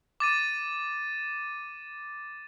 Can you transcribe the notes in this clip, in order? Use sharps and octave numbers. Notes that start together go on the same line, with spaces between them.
D6 A6 D#7